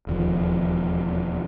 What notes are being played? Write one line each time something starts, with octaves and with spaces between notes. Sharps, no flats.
E1 D#2 F3